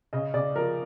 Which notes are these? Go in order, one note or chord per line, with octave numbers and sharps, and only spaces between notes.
C#3 D#5
C#3 D5
F3 A#4